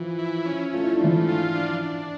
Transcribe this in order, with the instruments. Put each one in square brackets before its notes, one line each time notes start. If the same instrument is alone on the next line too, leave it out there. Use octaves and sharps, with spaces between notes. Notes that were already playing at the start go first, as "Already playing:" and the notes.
Already playing: [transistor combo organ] E3 [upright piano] F3 F4
[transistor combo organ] E4
C#4
[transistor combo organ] A3 [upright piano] F4
[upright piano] E4
D4
[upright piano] E3 E4 [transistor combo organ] F3
[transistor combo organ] F4
D4
D4